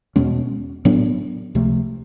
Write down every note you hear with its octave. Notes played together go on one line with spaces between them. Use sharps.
E2 B2 G#3 C#4
A2 F#3 B3 D4
C#2 C3 F3 A3